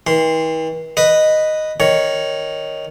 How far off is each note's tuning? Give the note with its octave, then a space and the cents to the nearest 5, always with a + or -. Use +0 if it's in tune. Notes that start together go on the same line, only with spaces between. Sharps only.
E3 -45 C6 -10
B4 +0 D#5 -5
D#3 +0 C#5 +0